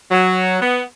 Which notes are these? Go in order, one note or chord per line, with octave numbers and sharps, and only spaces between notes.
F#3
B3